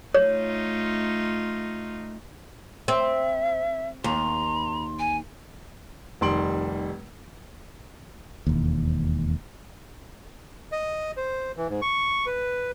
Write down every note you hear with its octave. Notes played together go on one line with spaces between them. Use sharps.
A3 D#4 F4 C#5
C4 E5
D#2 A#5 C6
G#5
F1 D#3 G3 C6 D7 F#7
E1 D#2
D#5
C5
E3
G#2
C#6
B4